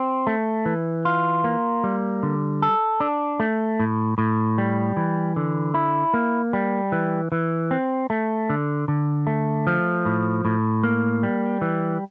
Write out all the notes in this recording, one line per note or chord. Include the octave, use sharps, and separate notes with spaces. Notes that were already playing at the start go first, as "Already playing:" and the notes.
Already playing: C4
A3
E3
F4
A#3
G3
D3
A4
D4
A3
A2
A2
G3
E3
D3
E4
A#3
G3
E3
E3
C4
A3
D3
D3
A3
F3
A2
A2
A#3
G3
E3